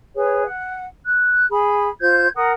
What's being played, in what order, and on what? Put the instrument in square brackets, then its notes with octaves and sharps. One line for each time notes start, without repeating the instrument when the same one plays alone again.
[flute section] G#4 B4 C#5
F#5
F#6
G#4 B5
F4 C5 G6 G#6
A#4 F#5 D#6